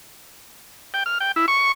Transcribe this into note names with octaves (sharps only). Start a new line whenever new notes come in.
G5
F6
G5
E4
C#6